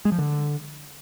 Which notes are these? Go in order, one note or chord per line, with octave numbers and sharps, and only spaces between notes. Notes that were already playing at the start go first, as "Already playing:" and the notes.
G#3
F3
D3